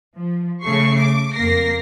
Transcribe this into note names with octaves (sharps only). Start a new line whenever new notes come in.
F3
C#3 A3 C#6 C7
D6
F2 A#3 A#4 A#6 C7